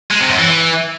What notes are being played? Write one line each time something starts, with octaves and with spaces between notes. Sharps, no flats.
G#3
C3
F#2
E3